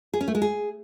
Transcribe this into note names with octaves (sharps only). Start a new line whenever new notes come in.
G#4
C#4
A3
G#3
G#4